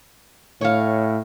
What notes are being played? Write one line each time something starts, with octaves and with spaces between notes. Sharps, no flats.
A2 C#5 F5